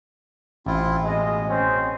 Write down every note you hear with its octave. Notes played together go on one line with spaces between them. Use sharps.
A1 C4 E4 F4
B2 G#3 D#5
C4 C#4